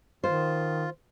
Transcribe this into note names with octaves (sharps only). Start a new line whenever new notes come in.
D#3 F4 C5